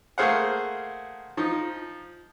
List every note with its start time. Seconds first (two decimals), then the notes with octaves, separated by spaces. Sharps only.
0.18 A3 A#3 G#4 C5 F5 F#5
1.37 F3 D#4